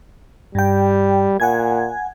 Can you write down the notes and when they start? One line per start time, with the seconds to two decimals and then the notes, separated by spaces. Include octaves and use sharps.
0.55 G2 G3 G5
1.40 A#2 F#5 G#5 G#6